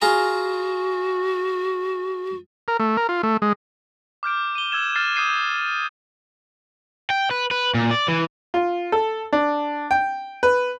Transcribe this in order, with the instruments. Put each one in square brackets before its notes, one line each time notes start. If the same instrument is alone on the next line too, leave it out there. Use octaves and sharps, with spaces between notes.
[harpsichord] F4 G#4 A#5 [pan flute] F#4
[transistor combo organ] A#4
A3
A#4
F4
A3
G#3
[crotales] D6 F6 G6 D7
D#7 G7
E6 G#6 E7
F6 A6 C7 E7 G7
D#6 G6 C7 D#7
[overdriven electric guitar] G5
B4
B4
A#2
D5
E3
[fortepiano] F4
A4
D4
G5
B4